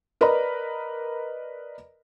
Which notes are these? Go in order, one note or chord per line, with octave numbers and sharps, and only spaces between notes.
A#4 B4 D5 D#5 A#5 B5